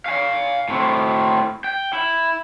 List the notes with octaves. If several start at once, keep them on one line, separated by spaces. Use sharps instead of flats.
F5 G#5
A2 C4
G5
E4